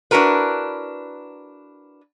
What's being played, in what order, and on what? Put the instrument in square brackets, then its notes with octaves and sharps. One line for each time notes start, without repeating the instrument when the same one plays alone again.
[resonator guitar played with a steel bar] D4 E4 F#4 A#4 B4